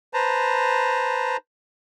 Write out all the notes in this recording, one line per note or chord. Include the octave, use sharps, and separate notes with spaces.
B4 C5 A5 A#5